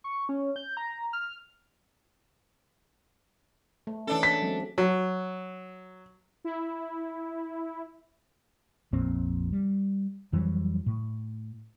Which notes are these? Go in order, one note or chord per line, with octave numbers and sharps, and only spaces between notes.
C#6
C#4
G6
A#5
F6
A3
E3 C#4 D4 A4
B6
F#3 G#3 C4
F#3
E4
A#1 F2 A#2 C4
G3
F2 E3 F#3 G3
A2